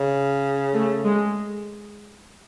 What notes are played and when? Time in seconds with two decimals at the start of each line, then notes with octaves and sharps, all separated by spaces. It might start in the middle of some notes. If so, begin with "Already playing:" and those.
Already playing: C#3
0.73 A3
1.05 G#3